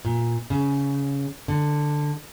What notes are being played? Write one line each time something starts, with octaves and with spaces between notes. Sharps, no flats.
A#2
C#3
D3